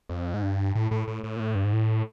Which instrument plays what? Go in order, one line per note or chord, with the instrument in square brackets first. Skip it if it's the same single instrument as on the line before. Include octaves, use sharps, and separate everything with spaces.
[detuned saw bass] F2
G#2
G2
A2
A2
A2
A2
A#2
A2
G2
G#2
A2